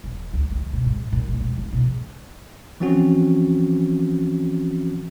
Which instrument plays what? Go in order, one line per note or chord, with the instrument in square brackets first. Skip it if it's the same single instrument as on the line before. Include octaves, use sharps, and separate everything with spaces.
[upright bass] D#1
D2
D2
B2
G#2
A#2
A3
E1
A#3
B2
C#3
[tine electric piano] E3 F3 C4 C#4 F#4